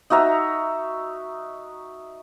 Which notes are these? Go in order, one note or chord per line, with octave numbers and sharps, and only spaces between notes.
D#4 F#4 E5 A#5